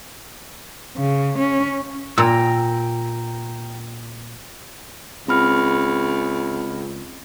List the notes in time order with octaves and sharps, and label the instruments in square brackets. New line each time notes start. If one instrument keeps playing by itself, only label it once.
[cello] C#3
C#4
[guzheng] A#2 [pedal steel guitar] G5 A#5 E6
[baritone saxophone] C#2 [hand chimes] C4 B5 F6